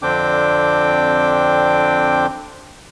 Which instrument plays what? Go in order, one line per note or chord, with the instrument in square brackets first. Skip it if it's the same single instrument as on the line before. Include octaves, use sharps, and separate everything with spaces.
[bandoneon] F2 D3 C4 D4 G5 D6